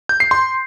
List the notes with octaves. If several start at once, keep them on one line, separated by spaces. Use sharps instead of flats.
G6
C7
C6